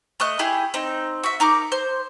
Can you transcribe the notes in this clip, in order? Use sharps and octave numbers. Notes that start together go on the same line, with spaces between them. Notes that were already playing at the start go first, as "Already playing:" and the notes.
A3 D#5 F#6
E4 G4 G#4
C4 D#4
F#4 E5
D#4 A#4 D6
C5